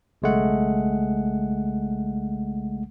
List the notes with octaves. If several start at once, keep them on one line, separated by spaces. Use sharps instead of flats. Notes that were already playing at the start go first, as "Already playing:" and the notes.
B1 C#3 G#3 A3 F#5